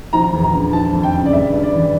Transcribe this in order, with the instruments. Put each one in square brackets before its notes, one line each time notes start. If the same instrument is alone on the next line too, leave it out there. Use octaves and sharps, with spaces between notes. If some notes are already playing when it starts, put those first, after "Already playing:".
[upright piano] F3 A#5
E2
A#5
D3
F3 A5
F2
G5
C#3
D5
G2 E5
G2
D5
E3